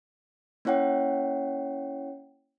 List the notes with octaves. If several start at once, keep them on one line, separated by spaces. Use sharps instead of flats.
A#3 C#4 E4 C#5 F#5 G5